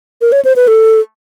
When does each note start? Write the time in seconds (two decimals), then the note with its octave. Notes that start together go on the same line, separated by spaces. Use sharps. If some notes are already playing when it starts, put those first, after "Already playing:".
0.21 A#4
0.32 C#5
0.45 C5
0.56 B4
0.68 A4